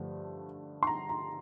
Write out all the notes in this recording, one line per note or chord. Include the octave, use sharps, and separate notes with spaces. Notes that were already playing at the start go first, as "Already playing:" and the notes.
Already playing: G2 D3 F3 A3
C6
A#5
A#5